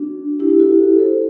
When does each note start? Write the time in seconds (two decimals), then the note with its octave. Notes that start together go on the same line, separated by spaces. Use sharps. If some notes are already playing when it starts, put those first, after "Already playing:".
Already playing: D4 F#4
0.39 E4 G4
0.50 E4 G4
0.59 F#4 A4
0.99 A4 C5